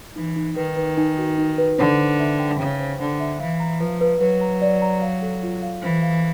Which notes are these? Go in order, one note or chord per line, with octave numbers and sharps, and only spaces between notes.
E3 D#4
D#4
D#3 B4
B4
D#4
F#4
D#4
B4
D3 C5
C5
E5
G5
C#3 G5
C5
D3 C5
E5
E3 F5
A#5
F3 B4
B4
F#3 B4
A#5
D5
A#5
F5
A4
F4
F5
E3 C5
F5